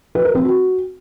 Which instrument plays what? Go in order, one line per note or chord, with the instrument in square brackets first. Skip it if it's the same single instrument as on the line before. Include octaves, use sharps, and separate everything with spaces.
[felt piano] B4
A#4
C4
F#4